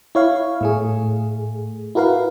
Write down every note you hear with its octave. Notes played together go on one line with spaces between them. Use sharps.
E4 C#5 F5
A2 A3 G#4
E4 F#4 A#4 B4 F5